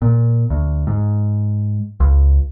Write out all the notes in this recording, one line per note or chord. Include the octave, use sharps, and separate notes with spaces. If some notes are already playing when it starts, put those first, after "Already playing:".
A#2
D2
G#2
C#2